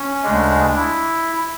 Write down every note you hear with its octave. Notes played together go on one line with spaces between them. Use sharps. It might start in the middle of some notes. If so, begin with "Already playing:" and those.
Already playing: C#4
D2 C#3 G#3 D4
E4